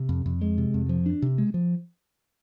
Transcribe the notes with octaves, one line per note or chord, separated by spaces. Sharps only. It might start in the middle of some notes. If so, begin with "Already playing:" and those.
Already playing: C3
F2
F2
G#3
C3
F2
F3
D4
C3
G#3
F3